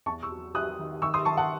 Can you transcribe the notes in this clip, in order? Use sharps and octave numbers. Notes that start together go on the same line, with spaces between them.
E2 A5 C#6
C#6 E6
F#3
F#3 D#6 F#6
D#3
D#3 C#6 E6
C6 D#6
D#3 A5 C#6
F#5 A5